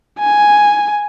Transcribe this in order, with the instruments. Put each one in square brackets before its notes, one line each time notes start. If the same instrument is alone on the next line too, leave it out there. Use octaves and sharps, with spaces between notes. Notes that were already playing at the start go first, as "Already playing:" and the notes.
[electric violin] G#5